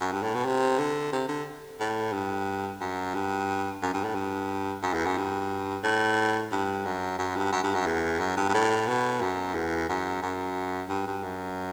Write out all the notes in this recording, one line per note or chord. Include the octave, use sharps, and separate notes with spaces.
F#2
G2
A2
B2
C3
D3
C3
D3
A2
G2
F#2
G2
F#2
G2
A2
G2
F#2
E2
F#2
G2
A2
G2
F#2
F#2
G2
F#2
G2
F#2
E2
F#2
G2
G2
A2
B2
F#2
E2
F#2
F#2
G2
G2
F#2